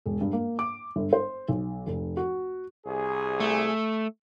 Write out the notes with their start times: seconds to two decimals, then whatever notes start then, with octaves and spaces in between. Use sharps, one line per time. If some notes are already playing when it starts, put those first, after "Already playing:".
0.06 E1
0.21 G2
0.33 A#3
0.59 D6
0.96 G1
1.13 C5
1.48 B1
1.87 F1
2.17 F#4
2.86 C2 G#4
3.40 A3